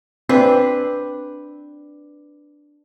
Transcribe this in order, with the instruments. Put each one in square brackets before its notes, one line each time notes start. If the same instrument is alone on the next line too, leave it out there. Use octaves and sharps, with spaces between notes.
[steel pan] C4 [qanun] D4 B4